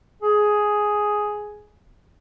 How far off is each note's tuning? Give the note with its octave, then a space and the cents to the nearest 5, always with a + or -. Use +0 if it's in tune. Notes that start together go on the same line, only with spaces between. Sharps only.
G#4 +5